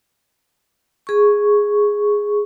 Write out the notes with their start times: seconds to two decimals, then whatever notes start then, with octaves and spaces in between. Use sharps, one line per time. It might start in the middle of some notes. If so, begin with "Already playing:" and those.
1.07 G#4 C#6